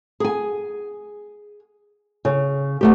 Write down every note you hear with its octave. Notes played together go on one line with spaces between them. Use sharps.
G#4 G#5
C#3
E2 A3 G4